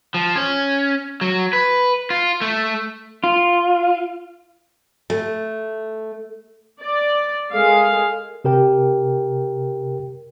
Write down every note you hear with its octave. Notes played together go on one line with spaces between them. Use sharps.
F3
C#4
F#3
B4
F4
A3
F4
A3
D5
G#3 A4 A#4 F5 G#5
C3 G4 A#4 G5